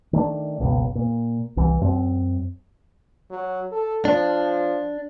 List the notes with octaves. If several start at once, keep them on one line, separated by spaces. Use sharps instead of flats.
D#3 A3 C#4 D4
F#1 C#2 B2
A#2
C2 E3
F#2 C4
F#3
A4
F3 D4